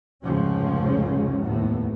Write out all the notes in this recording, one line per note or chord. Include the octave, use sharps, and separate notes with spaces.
F1 C#2 G#2 F3 C#4
F1 D#2 A2 B3